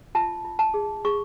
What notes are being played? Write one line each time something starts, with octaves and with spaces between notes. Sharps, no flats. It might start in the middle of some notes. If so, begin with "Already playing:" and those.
F4 A5
F4
A5
G#4
G#4 C#6